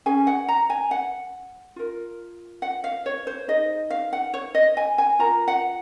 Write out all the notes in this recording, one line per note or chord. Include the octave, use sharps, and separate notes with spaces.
C#4 G#4 G#5
F#5
A#5
G#5
F#5
F4 A#4
F#5
F5
C#5
C5
D#4 G#4 D#5
F5
F#5
C#5
D#5
G#5
G#5
F4 A#4 A#5
F#5